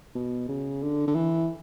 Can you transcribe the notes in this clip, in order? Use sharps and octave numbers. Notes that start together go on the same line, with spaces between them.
B2
C#3
D3
D3
E3